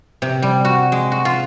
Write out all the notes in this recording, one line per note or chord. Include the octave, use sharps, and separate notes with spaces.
C3
G3
F#4
G#3
F#4
F4